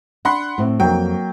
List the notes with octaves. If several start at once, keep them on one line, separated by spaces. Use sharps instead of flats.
D4 F#5 B5 C6
A2 C4
F2 F#3 A#3 G5